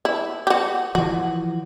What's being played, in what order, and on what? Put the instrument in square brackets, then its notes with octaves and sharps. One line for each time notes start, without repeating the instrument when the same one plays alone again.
[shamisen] E4
F#4 G4
[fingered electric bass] E3 F3 [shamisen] F#4